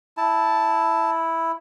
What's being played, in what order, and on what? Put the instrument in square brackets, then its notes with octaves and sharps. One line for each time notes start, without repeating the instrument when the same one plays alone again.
[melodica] E4 [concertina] A5